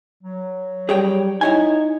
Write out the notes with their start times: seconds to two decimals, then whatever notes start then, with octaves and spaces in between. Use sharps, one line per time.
0.23 F#3
0.89 G3 G#4 C#5 G5
1.41 D#4 E4 C#5 G#5